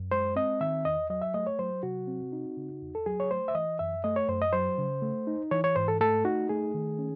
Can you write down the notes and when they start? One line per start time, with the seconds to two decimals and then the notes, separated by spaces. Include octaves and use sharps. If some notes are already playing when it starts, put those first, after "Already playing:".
Already playing: F#2
0.11 G#3 C5
0.36 C4 D#5
0.61 D#3 E5
0.85 E2 D#5
1.10 F#3 D#5
1.22 E5
1.34 A3 D#5
1.47 C#5
1.59 F#3 C5
1.83 C3 F#4
2.07 C4
2.32 D#4
2.57 C#3
2.82 E2
2.95 A4
3.06 F#3 G#4
3.20 C#5
3.30 A3 C5
3.48 E5
3.55 E3 D#5
3.79 F#2 E5
4.04 A3 D#5
4.16 C#5
4.29 F#2 C5
4.42 D#5
4.53 F#3 C5
4.78 C#3
5.02 A3
5.27 D#4
5.51 E3 C#5
5.64 C#5
5.76 G#2 C5
5.88 A4
6.01 A3 A4
6.25 D#4 F#4
6.49 A3 G#4
6.74 D#3
6.99 C#4